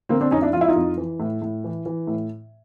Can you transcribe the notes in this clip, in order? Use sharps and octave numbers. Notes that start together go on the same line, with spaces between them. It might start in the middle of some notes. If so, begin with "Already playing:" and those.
D3 A#3 C4
C4 D4
F2 C#4 D#4
D4 E4
F3 F4
E4
D#4 F4
F2
E3
A2
A2
E3
E3
A2